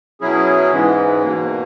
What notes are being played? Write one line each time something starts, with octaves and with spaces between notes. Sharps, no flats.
B2 F#3 C#4 E4 G#4
G#2 E3 G#3
E2 B2 A#3